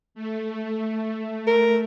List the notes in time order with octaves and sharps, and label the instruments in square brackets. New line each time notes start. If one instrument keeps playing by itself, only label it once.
[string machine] A3
[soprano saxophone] A#4